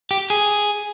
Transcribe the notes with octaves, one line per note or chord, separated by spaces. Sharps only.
G4
G#4